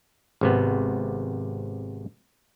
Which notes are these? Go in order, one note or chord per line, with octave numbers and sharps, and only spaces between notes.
G#1 C3 B3